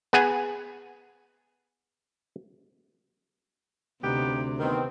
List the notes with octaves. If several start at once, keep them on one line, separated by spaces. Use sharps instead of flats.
B3 G#4 F#5 G#5
D2 C3 B3 D#4 G4
D#3 B3 C4